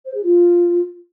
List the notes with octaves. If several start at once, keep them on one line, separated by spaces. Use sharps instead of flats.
C5
G#4
F4